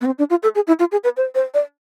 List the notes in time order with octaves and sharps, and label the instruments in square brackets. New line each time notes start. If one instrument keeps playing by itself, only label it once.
[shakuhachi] B3
C4
D4
F4
A4
G#4
E4
F4
G#4
B4
C5
C5
D5